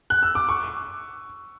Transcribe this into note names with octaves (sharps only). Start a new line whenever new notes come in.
F#6
E6
D6
C#6